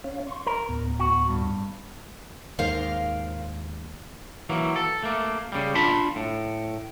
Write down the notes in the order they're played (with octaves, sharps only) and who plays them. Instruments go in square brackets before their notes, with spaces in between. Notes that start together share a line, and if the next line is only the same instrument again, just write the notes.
[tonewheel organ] C#4 C#5 F5
C6 C#6
[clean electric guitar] A#4
[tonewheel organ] D2 A2 B3
[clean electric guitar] F#4
G2
[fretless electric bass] D#2 G#2 [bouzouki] A#4 C5 F5
[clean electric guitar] E3 F#3 A#3
A4
A3 A#3
C#3 G3
D4 F4 A5 B5
A2